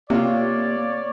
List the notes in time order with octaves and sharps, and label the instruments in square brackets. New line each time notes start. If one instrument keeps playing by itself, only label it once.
[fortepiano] C3 F4 [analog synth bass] A#3 [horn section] C#5 D5